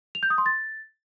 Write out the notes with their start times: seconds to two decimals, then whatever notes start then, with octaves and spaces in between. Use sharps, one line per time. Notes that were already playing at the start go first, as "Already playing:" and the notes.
0.15 F7
0.23 G6
0.30 D#6
0.38 C6
0.46 A6